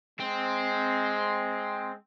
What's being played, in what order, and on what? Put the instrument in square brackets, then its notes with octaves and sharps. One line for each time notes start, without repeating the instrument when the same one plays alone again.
[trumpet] G#3 [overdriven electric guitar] C4